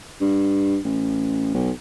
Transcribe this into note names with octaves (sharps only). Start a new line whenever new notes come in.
G2
A1
B1